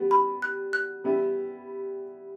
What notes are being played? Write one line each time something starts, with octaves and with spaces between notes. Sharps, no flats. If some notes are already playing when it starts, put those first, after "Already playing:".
Already playing: G3 B3 F#4
B5
F#6
F#6
G3 B3 E4 G4